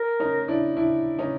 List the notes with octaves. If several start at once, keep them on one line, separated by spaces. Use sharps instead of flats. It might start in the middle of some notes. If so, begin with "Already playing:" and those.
Already playing: A#4
C#4 D#4
D4 E4
D4 E4
C#4 D#4